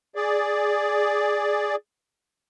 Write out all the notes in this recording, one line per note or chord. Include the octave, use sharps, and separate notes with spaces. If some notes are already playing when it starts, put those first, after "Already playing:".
G#4 D5